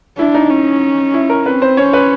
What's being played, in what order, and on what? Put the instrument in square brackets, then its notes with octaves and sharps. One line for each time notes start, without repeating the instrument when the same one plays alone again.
[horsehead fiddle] D4 [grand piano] E4
[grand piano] D#4
[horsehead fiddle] C#4
[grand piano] E4
A#4
[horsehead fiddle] C4 [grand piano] B4
[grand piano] C5
[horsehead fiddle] C#4 [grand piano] C#5
[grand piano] B4